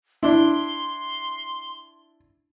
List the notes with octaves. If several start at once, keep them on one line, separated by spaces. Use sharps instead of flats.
D4 E4 C6